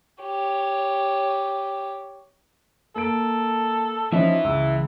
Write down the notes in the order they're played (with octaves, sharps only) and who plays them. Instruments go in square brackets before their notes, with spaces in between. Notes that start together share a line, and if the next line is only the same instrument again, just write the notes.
[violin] G4 C#5
[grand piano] A#3 D7 [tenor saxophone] A4
[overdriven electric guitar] E3 E5 [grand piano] F3 C#4 D#4
[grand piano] C#2 E6